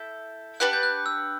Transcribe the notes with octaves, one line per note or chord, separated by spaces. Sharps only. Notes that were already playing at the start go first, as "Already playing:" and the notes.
Already playing: E4 A4 E5 G6
D4 G4 B4 F#5 F#6
G6
F#6
E6